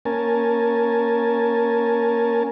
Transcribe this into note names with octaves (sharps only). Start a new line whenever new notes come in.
A#3 C#4 A#4 G#5 A5